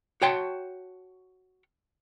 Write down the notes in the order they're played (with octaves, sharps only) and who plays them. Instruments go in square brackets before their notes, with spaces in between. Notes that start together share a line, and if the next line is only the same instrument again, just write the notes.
[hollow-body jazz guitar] F#4 C#5 G5 A5 C6